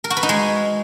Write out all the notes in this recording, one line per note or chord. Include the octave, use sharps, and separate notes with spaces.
A#4
F#4
B4
D#4
G#3